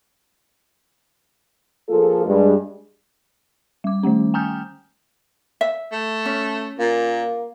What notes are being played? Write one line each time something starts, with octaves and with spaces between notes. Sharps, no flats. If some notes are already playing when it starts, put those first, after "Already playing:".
F3 A#3 F4 G#4 A4
G2 G#3
G3 D6
D#3 G3 A3 C#4
G5 G#5 A#5 D#6 F6 G6
E5
A3
C#4
A#2 A#3